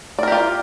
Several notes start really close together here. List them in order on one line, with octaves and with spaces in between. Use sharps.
D5 A#4 G4 F4